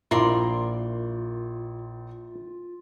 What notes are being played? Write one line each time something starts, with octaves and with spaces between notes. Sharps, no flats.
A#1 A#3 E4 F4 A#4 D5 C6